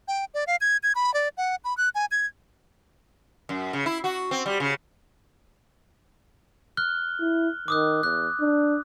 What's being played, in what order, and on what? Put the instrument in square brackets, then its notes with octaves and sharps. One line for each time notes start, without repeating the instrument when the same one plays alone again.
[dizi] G5
D5
F5
G#6
G#6
B5
D5
F#5
B5
F#6
G#5
G#6
[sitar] F#2
C#3
E4
F#4
C4
G3
C#3
[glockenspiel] F6 F#6 G7
[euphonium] E4
[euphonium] D#3 [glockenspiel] D6 D#6 F#6
[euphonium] E2 [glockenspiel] F#6
[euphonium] D4